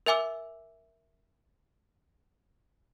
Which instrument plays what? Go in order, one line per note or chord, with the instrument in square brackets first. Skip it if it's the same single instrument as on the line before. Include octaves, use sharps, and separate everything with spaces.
[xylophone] A#4 E5 G#5 D6 E6